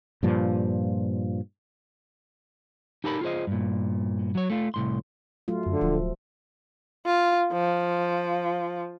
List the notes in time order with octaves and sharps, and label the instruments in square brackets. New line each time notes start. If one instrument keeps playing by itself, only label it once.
[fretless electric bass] G2 A#2 F3
[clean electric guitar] D#4 G4 A4 A#4 A5 B5
F4 G#4 C5 D#5
G2 A#2
F#3 C#5
A3 F4
C2 A2 C6
[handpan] F#3 A3 F4
[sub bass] F#2 [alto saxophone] D3
[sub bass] D1 [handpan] F3
[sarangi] F4
F3